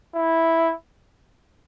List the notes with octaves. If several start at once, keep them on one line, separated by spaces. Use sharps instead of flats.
E4